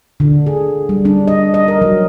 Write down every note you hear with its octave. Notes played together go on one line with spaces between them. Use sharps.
D3
G#4
G3
D4
D#5
D#5
A#4
F#3